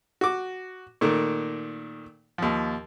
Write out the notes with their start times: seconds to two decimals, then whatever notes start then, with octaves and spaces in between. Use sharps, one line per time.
0.21 F#4 D6
1.01 A#2 D#3 A3
2.38 D#2 F3